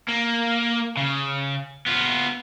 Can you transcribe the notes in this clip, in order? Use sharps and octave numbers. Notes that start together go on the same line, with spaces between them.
A#3
C#3
B3 F4